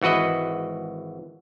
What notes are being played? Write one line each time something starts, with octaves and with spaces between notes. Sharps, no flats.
G#1 E3 F#4 B4 D#5